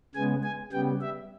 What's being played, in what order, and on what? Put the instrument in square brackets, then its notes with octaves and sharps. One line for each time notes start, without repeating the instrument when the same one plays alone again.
[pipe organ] C#3 G#3 B3 G#5
G#5
C#3 G3 B3 G5
E5